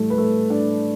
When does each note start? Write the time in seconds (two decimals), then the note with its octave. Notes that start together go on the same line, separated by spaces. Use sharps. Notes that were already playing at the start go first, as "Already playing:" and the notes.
Already playing: A2 E3 G3 A3 A4
0.10 B4
0.18 A3 A4
0.50 D4 D5